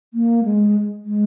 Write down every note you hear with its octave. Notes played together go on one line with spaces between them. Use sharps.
A#3
G#3
G#3